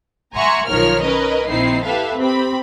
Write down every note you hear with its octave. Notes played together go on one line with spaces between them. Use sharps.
E5 F#5 G#5 A#5 C6 C#6
B1 D#3 F3 A#4 C#5 F6
C#4 A#4 B4 D#5
A#1 D#3 C4 D#4 E4 C7
E4 G4 A4 B4 E5 F5
C4 G4 B5